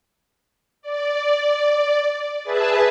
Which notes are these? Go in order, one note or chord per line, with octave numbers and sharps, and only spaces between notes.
D5
G#4 B4 E5 A5